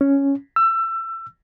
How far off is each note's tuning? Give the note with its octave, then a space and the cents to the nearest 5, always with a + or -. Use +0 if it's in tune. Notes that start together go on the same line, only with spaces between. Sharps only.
C#4 +0
E6 +25